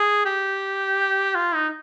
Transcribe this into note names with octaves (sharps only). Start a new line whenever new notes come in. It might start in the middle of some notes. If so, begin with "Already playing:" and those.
Already playing: G#4
G4
F4
D#4